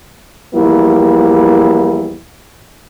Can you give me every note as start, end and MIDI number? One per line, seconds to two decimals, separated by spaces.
0.55 2.18 40
0.55 2.18 53
0.55 2.18 55
0.55 2.18 58
0.55 2.18 64